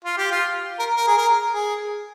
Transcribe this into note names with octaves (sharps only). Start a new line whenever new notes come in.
F4
G4
F4
A#4
A#4
G#4
A#4
G#4